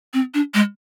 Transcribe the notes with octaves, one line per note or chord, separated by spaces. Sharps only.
C4
D4
G#3